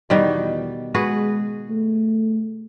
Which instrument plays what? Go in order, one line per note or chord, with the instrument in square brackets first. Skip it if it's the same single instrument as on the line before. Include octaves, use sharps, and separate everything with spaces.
[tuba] E2 [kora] B2 D#3 G3
[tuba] G#3 [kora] F#4 G#4 B4
[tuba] A3